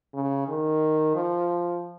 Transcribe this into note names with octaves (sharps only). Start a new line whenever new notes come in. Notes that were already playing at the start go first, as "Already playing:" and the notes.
C#3
D#3
F3